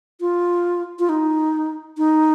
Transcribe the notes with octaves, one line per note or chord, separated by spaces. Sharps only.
F4
F4
D#4
D#4